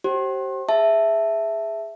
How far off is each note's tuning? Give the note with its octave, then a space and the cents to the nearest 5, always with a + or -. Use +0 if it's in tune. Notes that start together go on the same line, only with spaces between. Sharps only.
G4 -35 C5 +25
G#4 +0 E5 +0 A5 +0